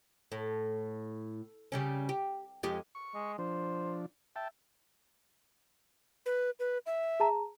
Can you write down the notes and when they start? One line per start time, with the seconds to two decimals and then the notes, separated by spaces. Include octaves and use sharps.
0.32 A2
1.72 C#3 G3 C#4
2.09 G4
2.63 F2 G#3 G4
2.95 C#6
3.14 G#3
3.38 F3 D4 C5
4.36 E5 G5 A5
6.26 B4
6.60 B4
6.86 E5
7.20 G#4 A5 A#5